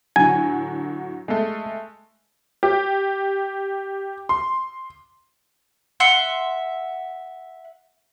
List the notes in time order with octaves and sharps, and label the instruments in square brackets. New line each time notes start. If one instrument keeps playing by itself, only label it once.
[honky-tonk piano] A2 D3 F#3 [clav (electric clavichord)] G#5
[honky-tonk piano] G#3 A3
G4
C6
[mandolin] E5 F#5 C6